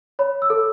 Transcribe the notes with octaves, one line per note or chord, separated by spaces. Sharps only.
C#5 B5
E6
A4